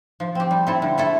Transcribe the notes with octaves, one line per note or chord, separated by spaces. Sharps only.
F3
C4 G4
G3
C4 E4 A4
D3
A3 E4 A4